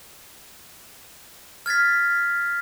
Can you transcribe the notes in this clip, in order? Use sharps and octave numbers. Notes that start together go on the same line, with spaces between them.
F6 G#6 A6 B6